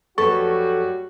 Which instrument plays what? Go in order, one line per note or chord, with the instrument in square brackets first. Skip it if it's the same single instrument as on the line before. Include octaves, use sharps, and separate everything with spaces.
[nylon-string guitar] F2 A3 B4 [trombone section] F#3 G3 F#4 [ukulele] A4 [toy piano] C#6